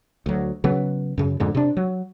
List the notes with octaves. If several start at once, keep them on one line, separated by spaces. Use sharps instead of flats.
D2 F#3
C#3 F#3 B3
F#2 C#3
F2 G#2 D3
C3 D4
F#3